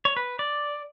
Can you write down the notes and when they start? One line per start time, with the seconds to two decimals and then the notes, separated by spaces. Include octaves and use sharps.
0.05 C#5
0.17 B4
0.39 D5